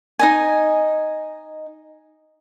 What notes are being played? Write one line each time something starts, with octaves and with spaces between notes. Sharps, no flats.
D#4 D#5 G#5